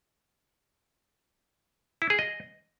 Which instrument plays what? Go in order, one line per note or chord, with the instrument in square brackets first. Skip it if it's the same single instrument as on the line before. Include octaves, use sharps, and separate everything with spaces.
[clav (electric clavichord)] E4
G#4
D#5